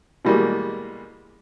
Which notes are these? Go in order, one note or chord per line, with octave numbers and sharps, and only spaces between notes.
B2 E3 G3 G#3 A#3